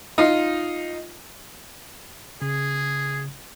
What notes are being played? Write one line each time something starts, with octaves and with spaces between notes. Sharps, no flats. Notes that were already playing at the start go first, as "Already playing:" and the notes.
D#4 F4
C#3 G#4